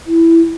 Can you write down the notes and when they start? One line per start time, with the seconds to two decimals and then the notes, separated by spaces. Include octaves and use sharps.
0.07 E4